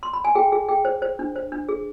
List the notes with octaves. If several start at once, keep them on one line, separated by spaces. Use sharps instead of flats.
C6
B5
G#5
G#4 G5
G#4
G#4 G5
C5
C5
D4
C5
D4
G#4